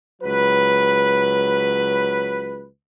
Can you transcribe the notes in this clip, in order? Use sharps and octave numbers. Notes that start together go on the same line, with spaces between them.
C#2 F#3 B4